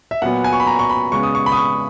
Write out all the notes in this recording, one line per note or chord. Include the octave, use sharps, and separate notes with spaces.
E5
A#2 F#3 B3 F#5
G#5
C#6
B5
A#5
C#6
B5
C#3 G#3 B3 C#6
D#6
C#6
B5
D#6
C#6